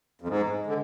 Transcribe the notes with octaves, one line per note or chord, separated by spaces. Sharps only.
F2
G#2 G#3
D3